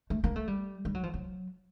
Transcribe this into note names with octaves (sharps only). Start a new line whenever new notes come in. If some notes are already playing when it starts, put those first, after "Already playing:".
A3
A#3
A3
G3
G3
F#3
F3
F#3